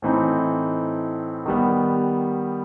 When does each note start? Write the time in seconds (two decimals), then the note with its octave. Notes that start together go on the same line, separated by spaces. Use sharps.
0.02 A2 E3 A3 C4 D#4
1.46 D#3 G3 B3